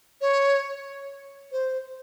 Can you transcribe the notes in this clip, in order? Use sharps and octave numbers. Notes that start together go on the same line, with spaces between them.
C#5
C5